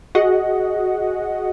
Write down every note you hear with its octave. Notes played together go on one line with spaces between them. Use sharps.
F#4 G#4 D#5 F#5